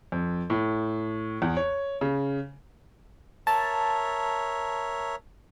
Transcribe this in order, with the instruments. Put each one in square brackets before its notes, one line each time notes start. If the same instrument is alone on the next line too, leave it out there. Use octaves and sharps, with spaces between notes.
[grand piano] F2
A2
E2
C#5
C#3
[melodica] A#4 C#5 E5 [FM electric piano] A5